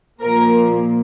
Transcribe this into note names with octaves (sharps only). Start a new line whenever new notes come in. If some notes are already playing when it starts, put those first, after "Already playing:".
A#2 F3 A#3 A#4